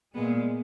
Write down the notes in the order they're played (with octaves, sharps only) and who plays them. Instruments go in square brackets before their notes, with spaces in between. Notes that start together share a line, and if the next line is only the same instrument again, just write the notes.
[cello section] A#2 G#3 B3